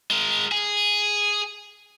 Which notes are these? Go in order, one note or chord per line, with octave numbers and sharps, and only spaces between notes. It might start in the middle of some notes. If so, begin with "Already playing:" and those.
G#3 A#4
G#4